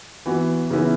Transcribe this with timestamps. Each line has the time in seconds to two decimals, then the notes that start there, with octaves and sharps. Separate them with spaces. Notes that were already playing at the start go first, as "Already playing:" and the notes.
0.26 E3 B3 F#4
0.70 C#3 E3 B3 E4